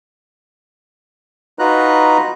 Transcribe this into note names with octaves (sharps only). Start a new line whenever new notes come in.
D#4 F4 F#4 B4 A#5 F#6